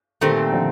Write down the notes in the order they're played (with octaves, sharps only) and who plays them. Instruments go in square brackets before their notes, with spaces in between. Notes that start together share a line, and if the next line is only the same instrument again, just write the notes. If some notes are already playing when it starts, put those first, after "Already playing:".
[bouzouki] A#2 A3 C4 [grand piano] D#3 G3
[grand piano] D3 F3